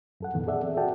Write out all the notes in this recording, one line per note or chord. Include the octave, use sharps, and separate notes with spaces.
F#2 A4 F#5
F2 A#2 D#3 E3 B3
G#4 A4 D5 E5 F#5
C4
F#4 A4 D5 F#5 G5 A5